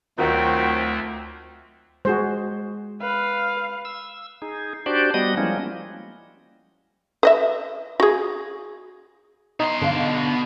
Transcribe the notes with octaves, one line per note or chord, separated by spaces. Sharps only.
D2 D#3 F#3 A3 C4 F4 F#4
G#3 F#4 G#4 C5
B4 F5
E6
D#4 G#4
D4 F#4 G4 C5 D5
G3 B3 F#4 D#5 D#6
F3 G3 G#3 A#3 C#4 E4
B4 D#5 E5
F#4 G#4
B2 D#4 C6
D3 F5